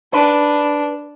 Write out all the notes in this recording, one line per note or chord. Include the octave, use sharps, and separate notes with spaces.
D4 B4